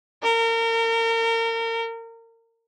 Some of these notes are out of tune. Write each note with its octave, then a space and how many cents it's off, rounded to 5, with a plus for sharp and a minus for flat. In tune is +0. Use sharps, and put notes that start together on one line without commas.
A#4 -35